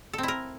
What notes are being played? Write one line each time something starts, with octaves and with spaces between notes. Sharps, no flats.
C4 E4 A4 A#4